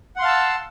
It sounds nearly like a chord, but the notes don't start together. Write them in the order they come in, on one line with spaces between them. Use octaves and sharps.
F#5 C6 F5 A5 E6